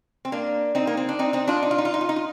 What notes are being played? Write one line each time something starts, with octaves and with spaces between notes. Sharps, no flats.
C4
A#3 D4
C4 D#4
A#3
C4
D4
C4 D#4
C4 D#4
D4 F4
D#4
F4
D#4
F4
D#4
F4
D#4
F4